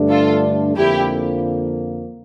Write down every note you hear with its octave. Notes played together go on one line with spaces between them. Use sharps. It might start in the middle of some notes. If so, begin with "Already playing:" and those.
Already playing: G2 D3 A3 D4
F4 A4
F2 D3 F3 A#3 E4 G4